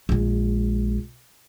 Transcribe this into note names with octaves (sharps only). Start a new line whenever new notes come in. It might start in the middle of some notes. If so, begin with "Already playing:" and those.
A#1 G#3